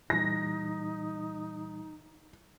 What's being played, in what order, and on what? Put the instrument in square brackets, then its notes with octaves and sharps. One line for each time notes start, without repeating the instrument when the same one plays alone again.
[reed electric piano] A#2 E3 G3 [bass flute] D#4 [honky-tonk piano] A#6